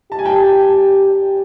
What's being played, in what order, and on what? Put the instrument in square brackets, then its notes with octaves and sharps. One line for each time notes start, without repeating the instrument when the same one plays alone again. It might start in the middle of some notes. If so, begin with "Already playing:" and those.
[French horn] G4 [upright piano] A5
[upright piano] G#5
G5 A5